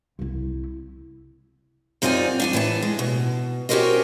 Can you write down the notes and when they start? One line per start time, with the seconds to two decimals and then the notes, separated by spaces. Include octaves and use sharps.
0.19 C2 E4
2.02 F#2 C4 D#4 F4 D5 G#5
2.40 D4 F#5 G#5
2.53 A2 E3 G5 A5
2.82 G#3
2.99 B2
3.69 C#4 F#4 G4 A#4 C5 D#5